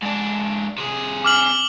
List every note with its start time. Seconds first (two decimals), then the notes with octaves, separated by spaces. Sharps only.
0.02 G#2 D4
0.78 C3 G#4
1.24 D6 F6 F#7